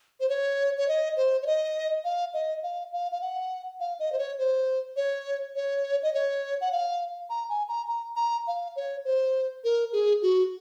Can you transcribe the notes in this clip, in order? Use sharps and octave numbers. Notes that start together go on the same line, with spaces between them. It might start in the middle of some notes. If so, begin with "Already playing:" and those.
C5
C#5
C#5
D#5
C5
C#5
D#5
F5
D#5
F5
F5
F5
F#5
F5
D#5
C5
C#5
C5
C#5
C#5
D#5
C#5
F#5
F5
A#5
G#5
A#5
A#5
A#5
F5
C#5
C5
A#4
G#4
F#4